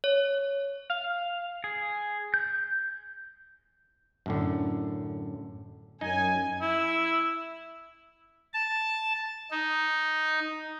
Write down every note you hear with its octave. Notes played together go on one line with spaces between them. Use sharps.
C#5
F5
G#4
G6
F#2 A2 D3
F#2 D#4 G#5
E4
A5
D#4